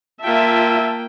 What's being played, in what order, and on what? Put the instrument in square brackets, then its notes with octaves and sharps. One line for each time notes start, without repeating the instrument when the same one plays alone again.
[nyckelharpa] A#3 G5 [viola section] F4 E5 [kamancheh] A5